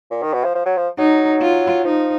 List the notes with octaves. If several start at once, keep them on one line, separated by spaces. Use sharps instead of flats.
A#2
D#3
B2
F3
F3
F#3
F3
F#3 D#4
F4
F3 D#4